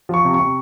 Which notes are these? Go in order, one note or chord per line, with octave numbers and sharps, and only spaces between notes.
F3 C#6
C3
C#6
C3